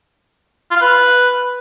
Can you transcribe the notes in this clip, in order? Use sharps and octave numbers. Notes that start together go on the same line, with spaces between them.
F4
F5
B4